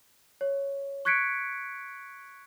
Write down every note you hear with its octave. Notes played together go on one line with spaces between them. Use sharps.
C#5
C#6 F#6 G#6 B6 C#7 D7